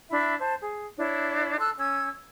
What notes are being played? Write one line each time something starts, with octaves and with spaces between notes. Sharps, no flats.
D4 E4 E5 B5
C5 A5
G#4
D4 E4 C#5
A4 C6 E6 F#6
C#4 E6 G#6